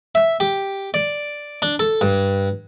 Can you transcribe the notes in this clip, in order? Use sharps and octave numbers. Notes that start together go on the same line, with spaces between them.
E5
G4
D5
D4
A4
G2